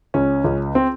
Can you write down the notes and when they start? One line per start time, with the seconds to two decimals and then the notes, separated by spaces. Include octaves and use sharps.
0.14 C#2 C#4
0.44 C#2
0.75 C4